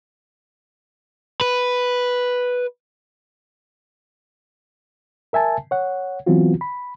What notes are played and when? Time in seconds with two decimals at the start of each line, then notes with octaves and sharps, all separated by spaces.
1.41 B4
5.33 A#4 E5 G#5 A5
5.71 C#5 F#5
6.26 E3 F#3 B3 C4 F4 F#4
6.61 B5